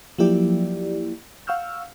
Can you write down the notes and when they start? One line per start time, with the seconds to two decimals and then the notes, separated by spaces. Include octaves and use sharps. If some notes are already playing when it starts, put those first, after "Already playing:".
0.18 F3 F#3 A#3 E4 G4 D5
1.47 F5 F#5 C#6 E6 F6 G6